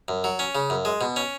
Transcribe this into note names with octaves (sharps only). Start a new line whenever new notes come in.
F#2
F#3
C#4
C#3
F#2
G#3
B2
C#4